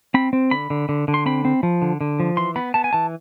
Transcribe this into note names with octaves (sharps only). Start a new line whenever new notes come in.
C4 B5
C4
D3 B5
D3
D3
D3
C6
C4 B5
C4
F3
D3
D3
F3
E3 C6
B3 B5
B3 A5
G#5
E3 A5